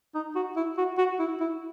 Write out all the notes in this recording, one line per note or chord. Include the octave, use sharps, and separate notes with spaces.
D#4
F#4
E4
F#4
F#4
E4
E4